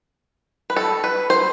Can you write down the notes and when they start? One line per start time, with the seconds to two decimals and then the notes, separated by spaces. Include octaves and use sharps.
0.70 B4
0.76 A4
1.04 B4
1.30 C5